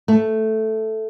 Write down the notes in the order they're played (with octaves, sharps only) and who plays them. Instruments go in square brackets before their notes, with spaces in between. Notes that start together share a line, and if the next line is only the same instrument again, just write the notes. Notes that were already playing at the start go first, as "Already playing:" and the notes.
[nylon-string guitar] A3